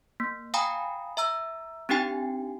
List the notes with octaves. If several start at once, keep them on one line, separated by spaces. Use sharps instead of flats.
A#3
F5 G5 G#5 A#5 B5 D#6
E5 A#5 E6
C4 D4 D#4 G4 G5 G#5